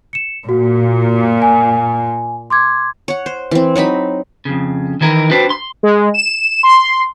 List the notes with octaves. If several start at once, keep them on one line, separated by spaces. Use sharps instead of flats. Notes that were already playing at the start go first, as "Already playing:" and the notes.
C#7 E7
A#2 F#4
G#5
C6 D6 G#6
C#5 F#5
C5
E3 C4
F#3 C4 D#4 B5
F2 C#3
D#3 E3 E4 A#4
D4 F#4 G4 B4 C5
C6
G#3
E7
C6